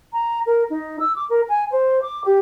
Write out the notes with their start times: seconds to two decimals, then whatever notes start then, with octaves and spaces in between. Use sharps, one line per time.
0.13 A#5
0.46 A#4
0.70 D#4
1.00 E6
1.16 D6
1.30 A#4
1.49 G#5
1.71 C5
2.02 D6
2.24 G4